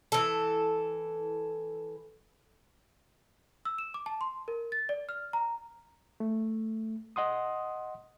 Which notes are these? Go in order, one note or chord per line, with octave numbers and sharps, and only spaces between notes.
E3 A4
E6
E7
D6
A5
C6
A#4
A6
D5
F6
A#5
A3
D#5 F#5 C6 D#6